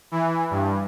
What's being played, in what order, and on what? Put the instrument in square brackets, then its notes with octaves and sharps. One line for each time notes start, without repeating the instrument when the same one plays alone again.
[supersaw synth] E3
G2